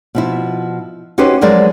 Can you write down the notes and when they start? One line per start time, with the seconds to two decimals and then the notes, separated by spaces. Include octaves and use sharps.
0.15 B2 F3 E4
1.18 C#4 D#4 F#4 G4 B4 C5
1.41 F3 F#3 G#3 A#4 C5 D5